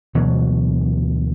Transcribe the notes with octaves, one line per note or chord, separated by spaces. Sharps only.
D2 B2 E3 F#3